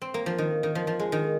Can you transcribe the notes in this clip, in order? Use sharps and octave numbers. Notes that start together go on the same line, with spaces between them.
C4
A#3
F3
D#3
D#3
F3
F3
G#3
D#3